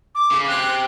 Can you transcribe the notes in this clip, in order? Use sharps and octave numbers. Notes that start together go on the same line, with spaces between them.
D6
C#3
C4 G4 F#6